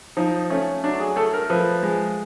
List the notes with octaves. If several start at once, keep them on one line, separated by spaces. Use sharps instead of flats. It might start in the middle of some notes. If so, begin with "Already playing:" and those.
F3 D#4
A3 C#4
F#3 D4
G#4
A3 A4
A#4
F3 B4
G#3